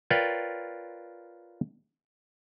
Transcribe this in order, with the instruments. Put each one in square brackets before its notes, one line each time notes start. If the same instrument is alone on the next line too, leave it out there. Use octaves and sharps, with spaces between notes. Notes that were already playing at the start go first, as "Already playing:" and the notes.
[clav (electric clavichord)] F4 A#4 B4 C#5 D5 G5